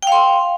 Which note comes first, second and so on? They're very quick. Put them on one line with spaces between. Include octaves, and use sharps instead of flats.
G5 F5 C6